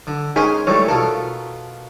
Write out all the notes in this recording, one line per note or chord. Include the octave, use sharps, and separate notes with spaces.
D3
C#4 D#4 G#4 A#4 C5 G#5
E3 G3 A3 C#5
B2 F4 A4 A#4